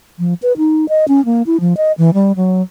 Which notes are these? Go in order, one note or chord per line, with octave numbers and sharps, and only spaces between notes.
F3
B4
D#4
D#5
C#4
A#3
E4
F3
D#5
E3
G3
F#3